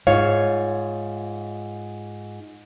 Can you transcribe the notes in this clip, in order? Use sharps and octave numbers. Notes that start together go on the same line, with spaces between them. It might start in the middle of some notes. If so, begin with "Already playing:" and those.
G#2 F4 C#5 F5